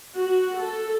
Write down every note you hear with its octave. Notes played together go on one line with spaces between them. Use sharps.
F#4
A4